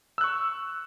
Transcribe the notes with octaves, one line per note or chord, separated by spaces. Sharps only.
C#6 E6 F#6